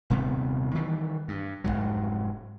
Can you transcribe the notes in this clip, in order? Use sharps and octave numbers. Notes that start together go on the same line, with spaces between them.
D#1 C3 G3 B3
D#3 E3 G3
G2
F1 B1 G#2 F#3